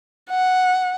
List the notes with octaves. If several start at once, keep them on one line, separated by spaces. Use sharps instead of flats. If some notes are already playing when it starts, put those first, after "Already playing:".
F#5